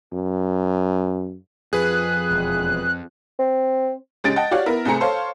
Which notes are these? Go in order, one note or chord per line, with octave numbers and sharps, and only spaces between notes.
F#2
F2 F3 G#4 B4 F#6
E1
C4
C#2 G#3 C#4 G4 A6 D7
D#5 F#5 G5 A5
F#4 G4 C#5 D5 F5 F#5
B3 E4 A#4
C2 A3 C4 G#4 A#5 C#7
A4 C5 C#5 F5